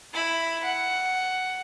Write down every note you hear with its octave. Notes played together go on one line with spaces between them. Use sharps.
E4 B5
F#5